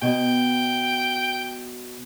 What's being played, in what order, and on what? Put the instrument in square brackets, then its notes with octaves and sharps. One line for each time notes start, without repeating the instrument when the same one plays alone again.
[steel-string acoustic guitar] B2 [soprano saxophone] G5